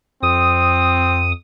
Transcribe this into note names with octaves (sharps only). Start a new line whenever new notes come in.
F2 C4 D#6